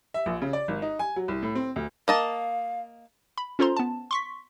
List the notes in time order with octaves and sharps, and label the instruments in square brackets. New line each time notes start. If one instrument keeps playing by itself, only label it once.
[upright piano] E5
A#1
C#3
D5
G#1
D#4
G#5
F#3
C2
A2
C4
D2
[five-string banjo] A#3 D#5 A5 [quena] F5
[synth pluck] B5
C#4 F4 A4 C5 A#5 C6
B3 A5
C6 C#6 B6